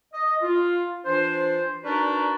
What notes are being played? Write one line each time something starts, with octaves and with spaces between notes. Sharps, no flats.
D#5
F4
E3 D4 F4 C5
D4 D#4 F#4 A#4 B4 D5